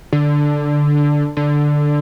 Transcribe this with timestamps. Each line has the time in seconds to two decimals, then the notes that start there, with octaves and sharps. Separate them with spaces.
0.13 D3
1.37 D3